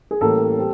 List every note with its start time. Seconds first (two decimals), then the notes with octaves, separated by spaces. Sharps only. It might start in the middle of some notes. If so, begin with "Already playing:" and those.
0.11 G#4
0.21 A2 E3 G3 A#3 C#4 A4
0.58 G3 C4